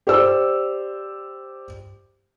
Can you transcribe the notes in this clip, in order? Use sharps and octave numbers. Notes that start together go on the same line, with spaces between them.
G4 C5 D5 E6